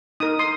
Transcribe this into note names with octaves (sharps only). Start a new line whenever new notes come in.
D#4 A#4 D#6
C6 D#6